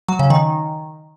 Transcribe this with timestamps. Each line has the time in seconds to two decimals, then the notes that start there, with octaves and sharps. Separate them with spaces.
0.08 F#3
0.19 C#3
0.30 D#3